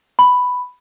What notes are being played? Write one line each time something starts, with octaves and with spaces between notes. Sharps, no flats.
B5